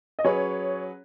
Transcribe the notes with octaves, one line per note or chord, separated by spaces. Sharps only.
D#5
F#3 C#4 G#4 B4 C#5